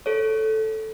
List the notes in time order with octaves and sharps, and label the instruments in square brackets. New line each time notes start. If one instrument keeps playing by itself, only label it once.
[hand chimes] A4 C#5